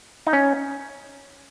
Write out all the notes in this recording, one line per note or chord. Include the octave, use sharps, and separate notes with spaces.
D#4
C#4